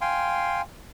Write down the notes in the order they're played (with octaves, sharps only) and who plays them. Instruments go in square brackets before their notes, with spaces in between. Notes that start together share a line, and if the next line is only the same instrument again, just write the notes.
[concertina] F5 G5 G#5 C6